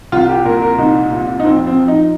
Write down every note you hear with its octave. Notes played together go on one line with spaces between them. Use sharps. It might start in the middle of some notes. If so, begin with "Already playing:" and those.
C2 F4
G4
A#2 A#4
A#4
C2 D#4
A#2
D#4
F2 C4
C4
F3
D#4